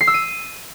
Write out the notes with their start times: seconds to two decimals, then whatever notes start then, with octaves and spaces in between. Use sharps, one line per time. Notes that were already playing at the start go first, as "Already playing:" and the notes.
0.01 C7
0.07 E6
0.14 D#7